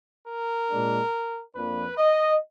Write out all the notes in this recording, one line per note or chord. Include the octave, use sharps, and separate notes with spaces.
A#4
A#2 G#3 D4
F2 F3 A#3 D4 B4
D#5